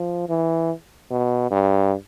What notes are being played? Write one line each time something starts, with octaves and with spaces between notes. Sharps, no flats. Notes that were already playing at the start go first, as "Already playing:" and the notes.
Already playing: F3
E3
B2
G2